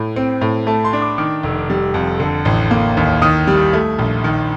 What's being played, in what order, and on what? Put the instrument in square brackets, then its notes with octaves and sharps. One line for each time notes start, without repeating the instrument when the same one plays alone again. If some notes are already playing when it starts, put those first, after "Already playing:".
Already playing: [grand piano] A2
C4
A2
A3 A5
C6
D4
D6
D#3 D6
F1
G3
F2
D3
A1
A#3
D#2
D#3 D#6
G3
A3
A#1
D#3